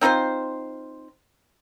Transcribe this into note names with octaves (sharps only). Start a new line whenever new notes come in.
C4 D#4 F4 C5